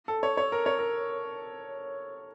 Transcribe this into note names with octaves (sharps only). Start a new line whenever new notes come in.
A4
C#5
C#5
A#4
C#5
A#4